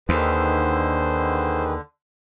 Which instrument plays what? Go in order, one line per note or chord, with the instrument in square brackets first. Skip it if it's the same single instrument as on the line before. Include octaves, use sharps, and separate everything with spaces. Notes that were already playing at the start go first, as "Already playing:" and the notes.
[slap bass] D#2 [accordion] D3 [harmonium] D#3 G#4 B4 [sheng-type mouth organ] C5